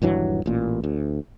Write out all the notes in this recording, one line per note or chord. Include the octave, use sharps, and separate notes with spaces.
D#1 G2 E3 F#3
A1 A#2
D2